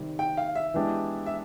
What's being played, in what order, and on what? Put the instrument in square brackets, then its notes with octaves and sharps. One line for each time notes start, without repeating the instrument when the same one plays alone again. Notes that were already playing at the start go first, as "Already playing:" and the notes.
Already playing: [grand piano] C3 D#3 G3
[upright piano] G5
F5
E5
[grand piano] E3 G#3 B3 D4 G4
[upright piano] E5